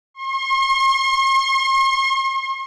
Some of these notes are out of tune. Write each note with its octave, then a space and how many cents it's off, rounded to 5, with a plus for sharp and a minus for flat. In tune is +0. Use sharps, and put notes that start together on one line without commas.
C6 +45